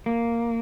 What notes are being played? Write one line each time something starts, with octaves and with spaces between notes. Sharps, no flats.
A#3